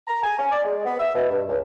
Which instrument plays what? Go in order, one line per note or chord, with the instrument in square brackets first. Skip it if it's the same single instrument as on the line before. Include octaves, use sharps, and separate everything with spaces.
[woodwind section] A#5
G#5
C#4
D5
G#3
B3
E5
B2
G2
C#2